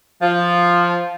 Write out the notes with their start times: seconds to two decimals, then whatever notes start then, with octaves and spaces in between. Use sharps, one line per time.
0.21 F3